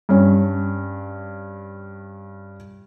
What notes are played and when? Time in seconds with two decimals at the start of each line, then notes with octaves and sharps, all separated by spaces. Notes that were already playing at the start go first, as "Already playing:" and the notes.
0.09 G2 C#4